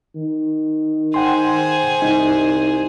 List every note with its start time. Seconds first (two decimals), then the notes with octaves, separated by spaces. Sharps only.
0.15 D#3
1.14 G#4 C5 F#5 G5 C6
2.02 C2 D#4